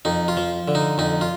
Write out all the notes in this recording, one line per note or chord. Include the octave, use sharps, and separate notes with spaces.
F2 D#4
F4
F3
D3
D#4
F2 D#4
F4